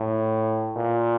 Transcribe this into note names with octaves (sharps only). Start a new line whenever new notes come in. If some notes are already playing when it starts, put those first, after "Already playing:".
Already playing: A2
A#2